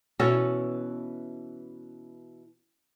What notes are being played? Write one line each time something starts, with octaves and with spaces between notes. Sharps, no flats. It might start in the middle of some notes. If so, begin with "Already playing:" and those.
B2 E3 C#4 E4 F#4 A4